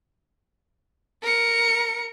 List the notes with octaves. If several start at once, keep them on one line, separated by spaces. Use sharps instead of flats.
A#4 C#7